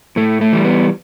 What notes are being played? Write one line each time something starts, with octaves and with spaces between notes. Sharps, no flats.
A2 A3
A3
E3 G3
B3